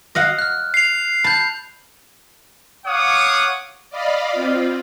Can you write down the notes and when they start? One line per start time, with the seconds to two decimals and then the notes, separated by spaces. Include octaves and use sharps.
0.15 D#5 F5 F#5
0.39 F6 F#6
0.74 C7 F7
1.24 A5 B5 G6
2.86 C#5 F5 F#5 D6 D#6
3.90 D5 D#5 F5 B5
4.32 C4 F4